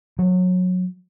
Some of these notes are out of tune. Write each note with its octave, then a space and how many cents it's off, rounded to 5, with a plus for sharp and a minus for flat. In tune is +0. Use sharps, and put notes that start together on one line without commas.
F#3 -20